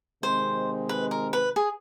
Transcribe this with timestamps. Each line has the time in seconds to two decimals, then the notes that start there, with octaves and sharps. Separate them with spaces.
0.23 C3 D#3 G#3 C4 C5
0.89 B4
1.11 A#4
1.33 B4
1.56 G#4